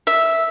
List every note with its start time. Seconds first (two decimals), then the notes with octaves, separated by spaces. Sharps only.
0.07 E5